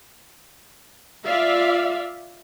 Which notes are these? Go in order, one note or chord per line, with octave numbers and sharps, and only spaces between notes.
F4 D5 E5 F5